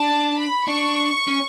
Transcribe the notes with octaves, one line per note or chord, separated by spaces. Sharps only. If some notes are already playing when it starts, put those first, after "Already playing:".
Already playing: D4 A5
B5
D4 C#6
C#4